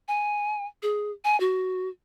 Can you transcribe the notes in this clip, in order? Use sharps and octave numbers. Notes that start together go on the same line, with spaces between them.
G#5
G#4
G#5
F#4